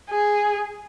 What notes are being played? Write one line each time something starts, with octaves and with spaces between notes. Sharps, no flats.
G#4